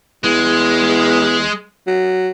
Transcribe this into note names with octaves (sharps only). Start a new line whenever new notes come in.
E2 G#3
F#3